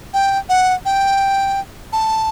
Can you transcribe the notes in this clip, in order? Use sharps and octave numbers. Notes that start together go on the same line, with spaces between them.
G5
F#5
G5
A5